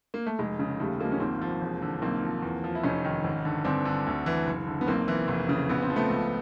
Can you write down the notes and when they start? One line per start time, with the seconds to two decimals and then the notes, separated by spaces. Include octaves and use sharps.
0.14 A#3
0.26 A3
0.39 F1 G#3
0.59 C#3
0.79 D#2 G3 A3
0.99 F3 G#3 A#3
1.12 C#4
1.20 G#1 A#3 C4
1.41 F3
1.61 E1
1.82 D3
2.02 B1 A#3 C4
2.22 F3
2.42 E2
2.64 F3
2.75 E4
2.84 F1 C#4 D#4
3.05 D#3
3.24 G#1
3.45 D3
3.65 G1 C4 D4
3.85 D3
4.06 D2
4.26 E3
4.46 F#1
4.67 D3
4.81 B3
4.87 B1 A#3 C4
5.08 E3
5.28 F1
5.49 C#3
5.69 A#1 B3
5.82 C4
5.90 F3
5.96 A3 B3
6.09 C#2